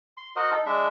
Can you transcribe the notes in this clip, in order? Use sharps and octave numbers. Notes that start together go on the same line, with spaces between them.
C6
F#4 A#4 C5 D#5
D#4 A4
G#3 D4 E5